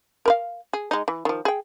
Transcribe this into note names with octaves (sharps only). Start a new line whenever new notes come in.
A#4 B4 F5
G#4
G#3 D#4
E3
D#3 F3
G#4 G5